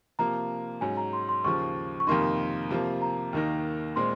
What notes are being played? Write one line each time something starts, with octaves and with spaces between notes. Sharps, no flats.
C3 F3 A#3 A#5
G#2 F#3 C#4 G#5
A#5
C6
C6
D#2 C#3 F3 C#6
C#6
F2 C3 D#3 A#3 D#4 C6
C3 F3 A#3
A#5
D#2 D#3 A#3 D#4
A#2 G#3 C4 C6